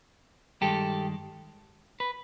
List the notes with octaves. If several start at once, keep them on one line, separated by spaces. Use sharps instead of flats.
G2 D#3 G#3 G4 A4
B4